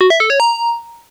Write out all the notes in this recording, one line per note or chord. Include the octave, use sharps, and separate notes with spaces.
F#4
E5
A4
C#5
A#5